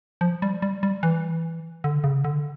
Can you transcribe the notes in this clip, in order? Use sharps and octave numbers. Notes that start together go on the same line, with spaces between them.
F3
G3
G3
G3
E3
D3
C#3
D3